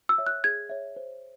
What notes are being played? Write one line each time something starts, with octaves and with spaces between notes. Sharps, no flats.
E6
C#5 E5
F#6
G#4 G#6
C#5 E5
C5